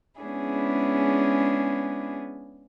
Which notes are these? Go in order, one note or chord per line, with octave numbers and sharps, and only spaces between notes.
G#3 B3 C#4 D4 E4 G#4